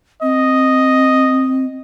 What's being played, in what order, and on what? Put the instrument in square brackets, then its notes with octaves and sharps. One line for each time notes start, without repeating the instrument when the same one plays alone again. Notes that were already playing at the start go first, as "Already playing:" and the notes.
[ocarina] C4 [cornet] D#5